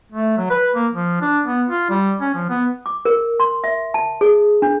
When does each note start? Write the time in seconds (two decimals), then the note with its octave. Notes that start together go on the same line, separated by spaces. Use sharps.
0.12 A3
0.38 F#3
0.50 B4
0.76 A#3
0.93 F3
1.21 D4
1.46 B3
1.69 F4
1.90 G3
2.21 C#4
2.34 F3
2.50 B3
2.86 D6
3.05 A#4
3.40 C6
3.64 E5
3.94 A5
4.21 G#4
4.62 D4